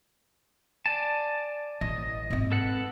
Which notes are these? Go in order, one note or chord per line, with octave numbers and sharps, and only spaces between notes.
D5 G#5 A5
A1 D#5
G#2 C4
A4 B4 F#5